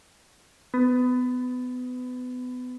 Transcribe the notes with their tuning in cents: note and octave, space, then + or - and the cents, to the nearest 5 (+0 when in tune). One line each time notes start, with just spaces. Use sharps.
B3 +25